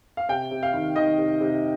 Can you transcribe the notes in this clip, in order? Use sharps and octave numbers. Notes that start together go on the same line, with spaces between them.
F5
C3 G5
C3
F5
D#3
D#3 D#5
C3
C3